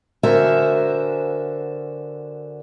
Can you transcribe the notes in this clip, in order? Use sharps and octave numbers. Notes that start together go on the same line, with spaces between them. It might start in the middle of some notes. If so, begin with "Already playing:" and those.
D3 F#4 A#4 C5 E5 G#5